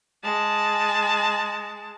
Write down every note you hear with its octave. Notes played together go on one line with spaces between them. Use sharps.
G#3 A5